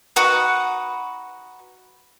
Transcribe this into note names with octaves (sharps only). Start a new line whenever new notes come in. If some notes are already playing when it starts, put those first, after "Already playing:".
D#4 F#4 B4 F#5